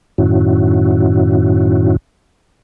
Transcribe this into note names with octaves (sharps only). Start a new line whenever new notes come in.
F#2 A2 D#3 C#4 E4 F#4